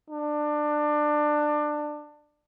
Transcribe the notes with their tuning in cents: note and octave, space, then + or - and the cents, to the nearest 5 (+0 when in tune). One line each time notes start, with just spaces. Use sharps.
D4 +20